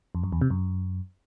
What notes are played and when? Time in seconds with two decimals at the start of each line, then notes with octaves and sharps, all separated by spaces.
0.15 F2
0.24 F#2
0.32 E2
0.41 C3
0.50 F#2